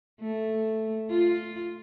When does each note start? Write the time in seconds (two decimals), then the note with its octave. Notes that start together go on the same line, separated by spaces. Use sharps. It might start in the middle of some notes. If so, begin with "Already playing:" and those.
0.21 A3
1.10 F4